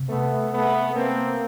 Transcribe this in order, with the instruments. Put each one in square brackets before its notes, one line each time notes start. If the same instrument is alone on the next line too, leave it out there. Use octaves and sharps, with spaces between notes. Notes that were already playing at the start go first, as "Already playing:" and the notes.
Already playing: [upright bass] C3
[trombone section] A3 B3
A3 B3
A#3 C4